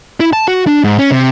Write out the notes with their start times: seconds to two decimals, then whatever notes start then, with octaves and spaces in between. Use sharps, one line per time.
0.20 E4
0.33 A5
0.48 F#4
0.67 D4
0.84 G#2
0.99 C#4
1.11 C3